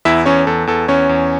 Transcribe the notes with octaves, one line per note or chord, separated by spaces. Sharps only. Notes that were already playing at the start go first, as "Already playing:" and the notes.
E2 E4 E5
E2 C#4 C#5
E2 A4
E2 A4
E2 C#4 C#5
E2